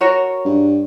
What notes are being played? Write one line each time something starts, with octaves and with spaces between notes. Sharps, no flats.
F#4 A#4 C#5
G2